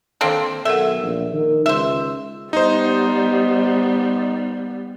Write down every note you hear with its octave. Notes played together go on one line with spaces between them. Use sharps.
D#3 A#3 C4 D4 A4
B1 A4 A#4 E5 F#5
A#1
D#3
C#2 C5 E5
G3 B3 D#4 C5